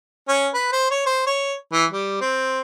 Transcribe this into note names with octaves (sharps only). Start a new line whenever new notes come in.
C#4
B4
C5
C#5
C5
C#5
E3
G3
C4